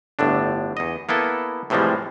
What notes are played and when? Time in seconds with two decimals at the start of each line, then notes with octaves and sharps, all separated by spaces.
0.19 G1 A2 D3 D4
0.77 E2 D#5
1.09 A#3 B3 E4 A4
1.70 A2 C3 E3 F3 G3 G#3